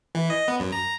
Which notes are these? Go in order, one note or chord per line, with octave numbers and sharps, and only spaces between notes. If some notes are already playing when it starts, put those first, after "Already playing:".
E3
D#5
B3
F#2
A#5